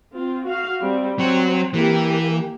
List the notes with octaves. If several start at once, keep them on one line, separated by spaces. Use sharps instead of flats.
C4 F4
F#4 F5
G3 C4
F#3 C4 F#4
E3 A#3 G4